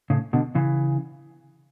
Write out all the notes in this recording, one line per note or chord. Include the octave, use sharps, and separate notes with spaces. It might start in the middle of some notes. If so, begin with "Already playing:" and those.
A2 C#3
B2 D3
C#3 E3